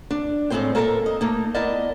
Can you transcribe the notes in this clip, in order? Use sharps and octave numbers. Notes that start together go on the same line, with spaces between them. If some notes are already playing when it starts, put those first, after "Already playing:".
D4
A2 G#3 A#3 C4 C5 G5
A#3 A4 A#4 C#5 E5
D#5
A3 A#3 D#4
B3 E4 A#4 D5 D#5 A5